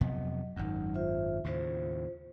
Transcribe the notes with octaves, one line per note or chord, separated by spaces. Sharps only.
F2 C3 F#3 B3 D#5
G#1 F#2 F#3 D#4
F4 C5 E5
D#2 A2 C#3 F4 C5